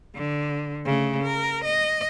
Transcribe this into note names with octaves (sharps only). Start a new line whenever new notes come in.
D3
C#3 A3
A#4
D#5